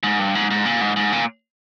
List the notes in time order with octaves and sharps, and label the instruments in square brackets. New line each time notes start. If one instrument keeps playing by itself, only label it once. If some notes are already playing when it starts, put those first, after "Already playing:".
[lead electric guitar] G#2
G2
G#2
G#2
A#2
G#2
G#2
A#2